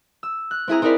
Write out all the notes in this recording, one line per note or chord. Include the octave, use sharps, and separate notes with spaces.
E6
F#6
C4 E4 G#4 A#5
C4 D#4 E4 A#4 D5 B5